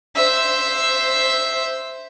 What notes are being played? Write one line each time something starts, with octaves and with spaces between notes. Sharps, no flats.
C5 E5